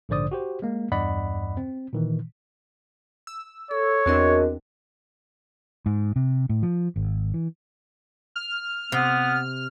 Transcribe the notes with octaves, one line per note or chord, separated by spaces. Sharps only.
A#1 G#2 D3 C5 D5 D#6
F#4 G4 C5
G#3 A#3
E2 G2 D5 D#5 F#5 B5
C4
A#2 D#3 E3
E6
A4 C#5
E2 C4 D4 F#4 A#4 D#5
G#2
C3
A2
F3
G#1
E3
F6
C3 B3